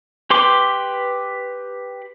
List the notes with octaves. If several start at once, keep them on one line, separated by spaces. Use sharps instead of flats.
G4 B4 C6 D6